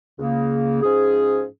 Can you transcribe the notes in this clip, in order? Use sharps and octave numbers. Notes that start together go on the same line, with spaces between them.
C#2 C#3 A#3
G#2 F3 C#4 G#4